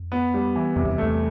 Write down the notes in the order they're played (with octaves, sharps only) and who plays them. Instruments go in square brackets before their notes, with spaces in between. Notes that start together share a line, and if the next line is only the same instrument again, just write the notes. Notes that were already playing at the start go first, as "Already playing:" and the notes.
Already playing: [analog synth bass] F2
[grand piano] B3
G3
E3
[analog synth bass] F2 [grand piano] C3
[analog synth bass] E2
[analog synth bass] E2 [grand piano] A3